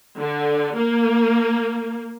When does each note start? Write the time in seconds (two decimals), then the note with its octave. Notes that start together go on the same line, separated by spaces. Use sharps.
0.18 D3
0.74 A#3